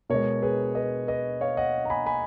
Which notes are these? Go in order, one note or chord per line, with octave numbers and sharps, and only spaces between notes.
B2 G#3 A#4 C#5
G#4 B4
B4 D#5
B4 D#5
C#5 F5
D#5 F#5
A#5
G#5 B5
G#5 B5